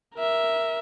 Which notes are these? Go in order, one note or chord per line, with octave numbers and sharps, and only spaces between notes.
A#4 E5